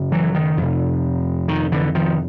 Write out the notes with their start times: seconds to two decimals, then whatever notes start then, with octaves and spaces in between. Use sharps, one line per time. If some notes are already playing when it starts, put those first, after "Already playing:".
Already playing: F#2 C#3
0.12 E3 F#3
0.35 D#3
0.57 F2 C3
1.48 D#3
1.72 D3 E3
1.95 D#3 F3